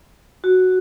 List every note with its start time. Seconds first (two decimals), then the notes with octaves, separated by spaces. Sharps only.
0.44 F#4